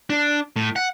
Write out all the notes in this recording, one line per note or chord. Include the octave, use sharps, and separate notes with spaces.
D4
A2
F#5